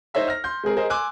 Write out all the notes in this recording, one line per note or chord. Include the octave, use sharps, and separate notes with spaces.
D#4 C5 C#5 D#5 E5 A#5
F6 A#6
C6 G6
G#3 C4 G#4 A#4
G#4 A#4 C5 D#5
G#5 C6 D6 E6 F#6